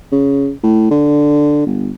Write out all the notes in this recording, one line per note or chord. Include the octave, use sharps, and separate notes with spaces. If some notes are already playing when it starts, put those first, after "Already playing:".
C#3
A2
D3
G1